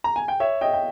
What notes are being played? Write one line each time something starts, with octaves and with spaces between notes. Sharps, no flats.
A#5
G#5
G5
C#5 E5
D#5 G5
G5